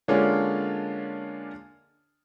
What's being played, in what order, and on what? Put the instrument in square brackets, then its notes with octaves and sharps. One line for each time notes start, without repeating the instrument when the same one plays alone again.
[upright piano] D3 G#3 A#3 C#4 D4 F4